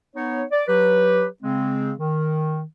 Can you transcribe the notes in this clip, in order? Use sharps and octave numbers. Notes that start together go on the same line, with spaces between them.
B3 D#4 C#5
D5
F#3 G4 B4
C#3 G#3 C4
D#3